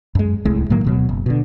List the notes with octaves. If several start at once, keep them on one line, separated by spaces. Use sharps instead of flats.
F#2 G#3
D1 C2 A2 G#3
A2 D#3 F#3 A#3
D1 B2 F#3
F#1
B2 D3